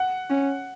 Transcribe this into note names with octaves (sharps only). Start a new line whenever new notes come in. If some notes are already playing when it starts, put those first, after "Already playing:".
Already playing: F#5
C#4